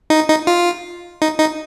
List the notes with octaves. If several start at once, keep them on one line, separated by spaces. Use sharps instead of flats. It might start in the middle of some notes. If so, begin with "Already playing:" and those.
D#4
D#4
F4
D#4
D#4